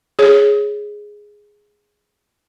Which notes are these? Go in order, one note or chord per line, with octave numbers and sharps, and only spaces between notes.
G#4 C#5